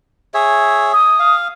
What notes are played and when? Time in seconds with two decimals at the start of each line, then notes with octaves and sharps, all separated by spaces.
0.34 G#4 C#5 E5
0.93 D#6
1.20 F5